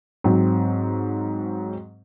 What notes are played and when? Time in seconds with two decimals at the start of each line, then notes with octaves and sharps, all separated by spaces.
0.24 G#2 F#3 C4